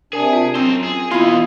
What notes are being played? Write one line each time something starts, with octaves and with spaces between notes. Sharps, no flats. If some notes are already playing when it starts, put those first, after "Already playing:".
C3 D4 G#4 A#4 G#5 A5
F4 A5
F#2 C4 A#4 C5
G#4
B2 E3 B3 E4 F4 D#5